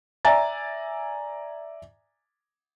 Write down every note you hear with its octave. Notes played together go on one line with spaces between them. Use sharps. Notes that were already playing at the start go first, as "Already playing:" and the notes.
D5 E5 G#5 A#5 A6